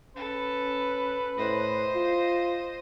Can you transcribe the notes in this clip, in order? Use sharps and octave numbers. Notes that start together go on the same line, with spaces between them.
C#4 A4 B4
A2 C5 D#5
F4